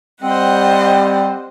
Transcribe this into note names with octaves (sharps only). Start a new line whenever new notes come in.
G3 C4 C5 D#5 F#5